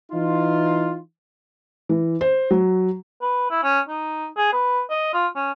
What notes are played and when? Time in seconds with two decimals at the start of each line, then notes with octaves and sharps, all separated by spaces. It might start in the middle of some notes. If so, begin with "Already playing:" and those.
0.12 E3 D#4 F4
1.89 E3
2.21 C5
2.51 F#3
3.22 B4
3.50 E4
3.63 C#4
3.88 D#4
4.37 G#4
4.53 B4
4.90 D#5
5.14 F4
5.36 C#4